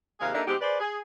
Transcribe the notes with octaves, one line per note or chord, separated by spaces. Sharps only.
D#2 C3 G#3 G#4 A#4 F5
A#3 D4 D#4 G4 A4 E5
B2 G#3 C4 D#4 G4
G#4 B4 C5 D5
G#4